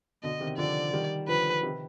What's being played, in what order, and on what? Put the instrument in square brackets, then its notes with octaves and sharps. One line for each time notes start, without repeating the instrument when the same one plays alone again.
[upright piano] B2 D3 [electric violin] D#5
[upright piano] C3 D#3
[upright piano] D3 F3 [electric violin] D5
[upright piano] D#3 G3
[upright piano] D3 F3 [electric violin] B4
[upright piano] C3 D#3